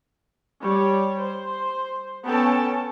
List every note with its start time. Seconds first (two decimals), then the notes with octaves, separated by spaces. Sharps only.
0.61 G3 C#5
1.19 C5
2.25 B3 C#4 A4 G5 A5